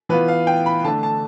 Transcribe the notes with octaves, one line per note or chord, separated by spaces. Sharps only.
E3 B3 F4 B4
F5
G5
B5
D3 A3 D4 A5
A5